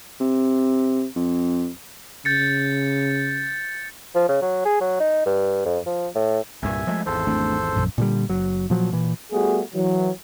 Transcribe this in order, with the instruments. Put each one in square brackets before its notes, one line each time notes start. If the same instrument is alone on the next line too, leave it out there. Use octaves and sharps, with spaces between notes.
[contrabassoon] C3
F2
[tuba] C#3 [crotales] G6 A6 C#7
[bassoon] F3
C#3
F#3
G#4
F#3
D#4
G2
F2
F3
A2
[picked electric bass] C2 G2 A#2 [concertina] E5 G#5
[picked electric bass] F3 G#3 A3
[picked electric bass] G#1 E2 [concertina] A4 C5
[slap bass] A3 C4 D4
A#1 F#2
[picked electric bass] A#2 D3 G3
F#1 F#3
A#2 F3 F#3
A#2 E3
[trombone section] G3 A3 B3 F#4 G#4
E3 F#3